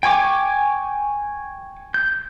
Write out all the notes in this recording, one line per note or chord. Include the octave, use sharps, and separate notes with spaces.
G5 G#5 C#6 D6
G6